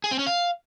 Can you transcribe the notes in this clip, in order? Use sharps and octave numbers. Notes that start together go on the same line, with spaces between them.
G#4
C4
C#4
F5